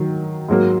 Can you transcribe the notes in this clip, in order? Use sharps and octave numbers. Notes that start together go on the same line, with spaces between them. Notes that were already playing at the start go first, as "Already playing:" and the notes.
Already playing: D#3 F#3
G#2 F#3 A#3